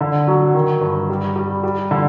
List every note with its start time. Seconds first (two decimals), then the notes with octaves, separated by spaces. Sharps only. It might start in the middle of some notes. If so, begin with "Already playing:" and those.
0.01 D3
0.27 F#3
0.54 D#3
0.81 G2
1.09 G3
1.36 G3
1.63 G3
1.91 D3